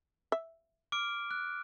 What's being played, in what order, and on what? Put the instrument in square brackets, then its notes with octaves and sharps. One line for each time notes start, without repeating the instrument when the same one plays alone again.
[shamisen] E5
[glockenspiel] D6 F6 D7
F#6